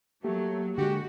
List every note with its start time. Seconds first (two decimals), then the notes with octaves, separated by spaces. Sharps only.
0.24 F#3 A3 A#3 G4
0.78 D3 G#3 F#4 G4